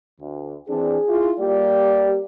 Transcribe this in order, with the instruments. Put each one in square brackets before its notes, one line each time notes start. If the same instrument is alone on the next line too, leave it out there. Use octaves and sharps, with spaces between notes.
[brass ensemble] D2
[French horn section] E3 C4 D4 [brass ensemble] G#4
[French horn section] E4 F4
[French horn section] G3 A#3 G4 [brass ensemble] D5